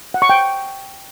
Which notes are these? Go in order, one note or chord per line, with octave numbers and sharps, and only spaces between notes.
F#5
C#6
G5